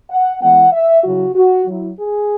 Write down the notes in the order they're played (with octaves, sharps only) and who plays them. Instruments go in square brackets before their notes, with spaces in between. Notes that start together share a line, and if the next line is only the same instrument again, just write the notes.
[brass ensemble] F#5
E3 G#3 B3 E4 F#5
E5
C#3 F#3 E4 F#4
F#4
F#3 E4
G#4